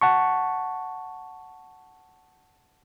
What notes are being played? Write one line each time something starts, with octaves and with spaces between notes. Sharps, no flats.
F#5 A5 C#6